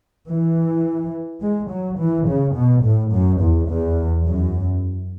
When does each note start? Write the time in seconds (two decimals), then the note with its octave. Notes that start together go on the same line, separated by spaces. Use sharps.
0.29 E3
1.42 G#3
1.70 F#3
2.00 E3
2.28 C#3
2.56 B2
2.84 A2
3.13 F#2
3.41 E2
3.69 E2
4.26 F#2